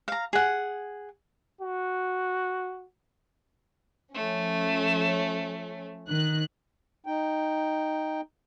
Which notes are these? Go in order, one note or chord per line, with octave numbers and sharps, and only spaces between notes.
F5 A#5
G#4 F#5
F#4
F3 A3 C#4
D#3 F#6
D#4 G5